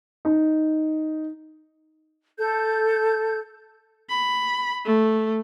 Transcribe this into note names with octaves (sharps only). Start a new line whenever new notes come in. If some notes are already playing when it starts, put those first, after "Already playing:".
D#4
A4 G6
B5
A3